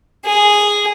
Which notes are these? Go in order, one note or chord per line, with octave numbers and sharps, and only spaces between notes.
G#4